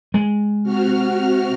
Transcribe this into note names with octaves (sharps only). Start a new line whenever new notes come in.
G#3
C3 F#4 F6